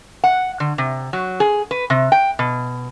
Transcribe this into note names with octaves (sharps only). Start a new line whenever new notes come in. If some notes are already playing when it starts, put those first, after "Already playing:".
F#5
D3
C3
F#3
G#4
B4
C3
G5
B2